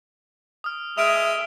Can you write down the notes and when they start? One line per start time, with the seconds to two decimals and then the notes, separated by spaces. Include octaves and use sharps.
0.64 D#6 F6
0.98 G#3 E5 D#6 F6 D7 F7